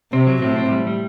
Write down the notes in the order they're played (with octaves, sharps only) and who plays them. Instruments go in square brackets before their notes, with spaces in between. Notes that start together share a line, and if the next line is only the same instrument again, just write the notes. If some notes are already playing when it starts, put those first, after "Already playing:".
[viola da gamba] C3 [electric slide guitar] C4
[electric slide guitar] F#3
[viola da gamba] A2 [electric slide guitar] C4
[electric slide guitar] C4
G3
G3